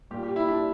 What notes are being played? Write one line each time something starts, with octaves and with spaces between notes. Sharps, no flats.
A#2 G3 G4
G4
E4
D4